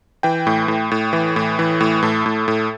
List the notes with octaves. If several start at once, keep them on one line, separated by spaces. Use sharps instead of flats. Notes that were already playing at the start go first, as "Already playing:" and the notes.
E3 G5
A2
A2
A2
E3
A2
E3
A2
A2 A4
A2
A2